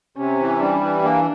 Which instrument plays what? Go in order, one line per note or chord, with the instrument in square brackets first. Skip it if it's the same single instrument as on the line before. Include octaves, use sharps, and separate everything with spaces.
[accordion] C3 [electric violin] C#4
[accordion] E3
[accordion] G3 [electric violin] D4
[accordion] E3
[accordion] A#3 [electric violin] D4